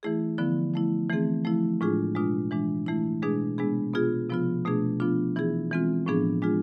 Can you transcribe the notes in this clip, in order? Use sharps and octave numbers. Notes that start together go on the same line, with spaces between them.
E3 A3 E4 G#4
D3 F3 B3 E4
F3 A3 E4
E3 A3 C4 G#4
F3 A3 E4
A2 G#3 D4 F4 G#4
B2 G#3 D4 F4
E3 G#3 D4
E3 A3 E4
B2 G#3 D4 G#4
C3 G#3 B3 D4 G#4
B2 B3 F4 G#4
C3 F3 B3 F4
B2 A3 D4 G#4
F3 B3 D4 F4
E3 B3 E4 G#4
E3 G#3 C4 F4
A2 F3 B3 D4 G#4
G#3 D4 F4 G#4